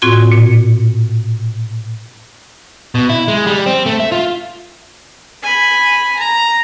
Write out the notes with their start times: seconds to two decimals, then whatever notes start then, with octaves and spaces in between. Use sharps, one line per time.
0.02 A2 C4 F4 F#4 C6 G#6
0.32 A#2
2.95 B2
3.09 E4
3.28 G#3
3.47 G3
3.66 C4
3.86 A3
4.00 E5
4.12 F4
5.43 G#5 B5
6.18 A#5